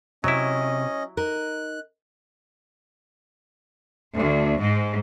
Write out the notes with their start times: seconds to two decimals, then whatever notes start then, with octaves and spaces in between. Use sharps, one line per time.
0.24 C3 F#3 C#4 E4 D#5
1.17 D#4 A#4 F#6
4.17 D2
4.60 G#2